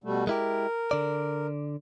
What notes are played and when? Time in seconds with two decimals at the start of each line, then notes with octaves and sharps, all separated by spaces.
0.04 B2 G3 A3
0.27 G#3 E4 G4 A#4
0.91 D3 D5